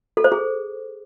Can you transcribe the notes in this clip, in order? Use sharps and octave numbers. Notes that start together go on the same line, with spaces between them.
A4
C5
G#4